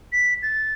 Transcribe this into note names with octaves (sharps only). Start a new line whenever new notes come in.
B6
A6